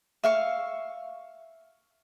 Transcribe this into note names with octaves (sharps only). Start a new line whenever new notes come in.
E5 F5 C#6